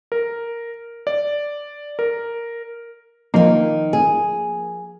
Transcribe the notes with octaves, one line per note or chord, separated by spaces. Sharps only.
A#4
D5
A#4
D#3 F3 A#3 D#4
G#4